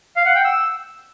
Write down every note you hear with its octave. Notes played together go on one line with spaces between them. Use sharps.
F5
F#5
G5
E6